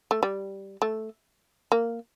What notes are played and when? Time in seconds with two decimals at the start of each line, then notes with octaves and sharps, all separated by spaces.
0.11 A3
0.23 G3
0.82 A3
1.72 A#3